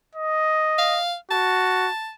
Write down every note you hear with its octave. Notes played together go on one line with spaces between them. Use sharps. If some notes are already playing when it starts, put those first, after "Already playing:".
D#5
F5
F#4 A5